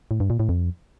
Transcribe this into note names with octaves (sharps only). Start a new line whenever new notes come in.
A2
G2
A#2
A2
F2